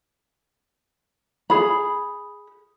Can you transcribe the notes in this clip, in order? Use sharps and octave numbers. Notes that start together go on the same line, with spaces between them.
G#4 B5